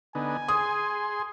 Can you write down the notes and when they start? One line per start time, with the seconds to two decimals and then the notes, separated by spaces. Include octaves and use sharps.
0.15 D3 B3 D#4 G#5
0.48 G#4 C6 D#6